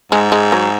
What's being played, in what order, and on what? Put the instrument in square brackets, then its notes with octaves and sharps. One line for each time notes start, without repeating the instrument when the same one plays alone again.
[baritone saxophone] G#2 [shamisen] G#3
[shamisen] G#3
F#3